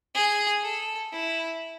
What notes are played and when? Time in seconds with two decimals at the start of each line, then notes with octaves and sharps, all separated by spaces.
0.15 G#4
0.63 A4
1.12 E4